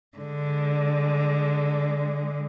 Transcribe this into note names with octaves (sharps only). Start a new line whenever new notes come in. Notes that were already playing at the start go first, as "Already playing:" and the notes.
D3 G#3